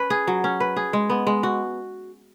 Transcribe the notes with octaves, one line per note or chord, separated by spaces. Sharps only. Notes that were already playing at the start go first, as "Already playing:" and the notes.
Already playing: C#4 B4
G#4
F#3
C#4
B4
G#4
G#3
B3
G#3
F#4